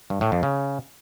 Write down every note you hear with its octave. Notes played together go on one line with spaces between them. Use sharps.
G2
A2
F2
C#3